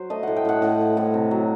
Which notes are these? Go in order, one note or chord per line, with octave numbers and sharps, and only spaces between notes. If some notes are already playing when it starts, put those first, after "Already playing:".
Already playing: F#3 C5
A3 D#5
A2 F#5
G5
A2 F#5
A2 F#5
A2
A2
C3
F#3